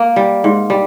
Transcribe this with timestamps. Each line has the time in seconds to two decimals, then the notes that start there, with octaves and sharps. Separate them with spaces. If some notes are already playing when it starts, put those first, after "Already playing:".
Already playing: A#3
0.16 G3
0.44 G#2
0.70 G3